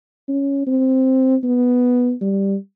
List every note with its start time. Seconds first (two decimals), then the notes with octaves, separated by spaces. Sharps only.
0.28 C#4
0.67 C4
1.44 B3
2.21 G3